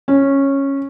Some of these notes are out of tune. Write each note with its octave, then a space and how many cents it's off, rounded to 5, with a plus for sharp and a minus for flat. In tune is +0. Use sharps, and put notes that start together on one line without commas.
C#4 -10